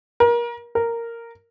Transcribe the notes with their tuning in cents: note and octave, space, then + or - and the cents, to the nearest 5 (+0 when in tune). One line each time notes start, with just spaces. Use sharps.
A#4 +25
A#4 -10